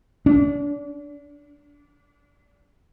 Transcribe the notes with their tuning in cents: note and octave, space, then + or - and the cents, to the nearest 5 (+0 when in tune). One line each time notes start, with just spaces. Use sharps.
D4 -35